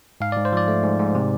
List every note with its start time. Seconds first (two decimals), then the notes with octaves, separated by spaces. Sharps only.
0.21 G#2 F5
0.32 D5
0.37 G#2
0.45 C5
0.52 F3 D5
0.68 A3
0.83 G#2
1.00 G#2
1.15 C3